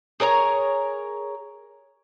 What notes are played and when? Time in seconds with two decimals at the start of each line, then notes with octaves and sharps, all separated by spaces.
0.20 G#4 A#4 C#5 A#5